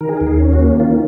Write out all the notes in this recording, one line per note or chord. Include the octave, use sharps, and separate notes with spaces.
D#3 A#4
G#4
A#4
D#2
G#4
C#4
F#4
A#3
D#3 F4